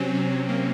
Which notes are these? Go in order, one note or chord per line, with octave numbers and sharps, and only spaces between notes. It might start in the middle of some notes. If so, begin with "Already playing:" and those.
Already playing: C3 F#3 C4 C#4
C3 C4
C#4
F#3
A#3